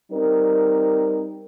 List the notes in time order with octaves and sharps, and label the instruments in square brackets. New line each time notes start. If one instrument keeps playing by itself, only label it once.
[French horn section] G3 C4 D#4 A#4